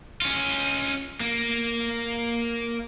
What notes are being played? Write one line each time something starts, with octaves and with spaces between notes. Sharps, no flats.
C#4 F4
A#3